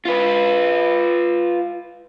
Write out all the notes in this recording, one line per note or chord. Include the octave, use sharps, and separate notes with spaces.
F4 B4